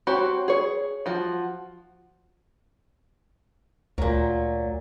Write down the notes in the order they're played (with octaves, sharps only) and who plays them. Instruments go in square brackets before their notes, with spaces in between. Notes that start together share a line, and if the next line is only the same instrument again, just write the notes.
[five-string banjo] C4 F#4 G4 C#5
G#4 C#5
F3 F#4
[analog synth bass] D2 [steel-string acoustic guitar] A#2 F#3